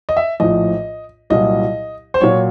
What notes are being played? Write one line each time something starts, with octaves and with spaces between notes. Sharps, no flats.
D#5
E5
A#1 A2 F3 D#5
C2 A#2 F#3 D#5
C5
A#2 F#3 C#5